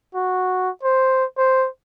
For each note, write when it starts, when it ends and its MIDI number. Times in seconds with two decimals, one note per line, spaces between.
0.15 0.70 66
0.83 1.25 72
1.38 1.67 72